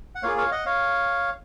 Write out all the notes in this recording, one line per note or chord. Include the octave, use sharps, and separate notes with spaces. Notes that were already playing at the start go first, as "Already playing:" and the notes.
F#5
A#3 F4 G#4 C#5 F5
C#5 F5
D#5 F#5
C#5 F5